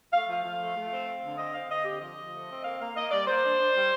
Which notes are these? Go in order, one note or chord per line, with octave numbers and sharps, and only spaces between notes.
A3 F5
F3
F5
F3
A3
A3
C4
C4
D3
C4 D#5
C4 F5
C4 D#5
D3 G4
F3 D#5
F3
A3
C4
A#3 F5
A#3 F5
A#3 D#5
G3 D5
A#3 C5
D4
D4
G3